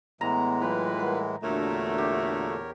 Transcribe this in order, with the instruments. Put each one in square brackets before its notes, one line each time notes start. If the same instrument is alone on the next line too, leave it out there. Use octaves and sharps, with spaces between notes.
[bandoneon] A2 E3 G#3 [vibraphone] B3 F#5 C6 [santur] A#5
[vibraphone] F#3 [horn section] A#3 F4 B4 [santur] G5
[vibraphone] G3 A#4 F#5
[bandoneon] E2 A#4 C#5 [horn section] A#2 D3 A3 [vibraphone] D4 F#4
[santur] G4